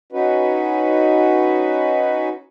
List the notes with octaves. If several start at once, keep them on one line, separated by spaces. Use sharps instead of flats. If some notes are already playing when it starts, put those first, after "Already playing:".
C#4 D#4 F#4 B4